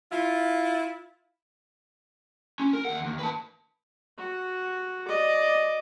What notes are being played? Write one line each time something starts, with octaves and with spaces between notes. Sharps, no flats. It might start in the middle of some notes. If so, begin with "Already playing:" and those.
E4 F4
C#4
A#4
D#2 F#5
D#2
B4 A5
F#4
D5 D#5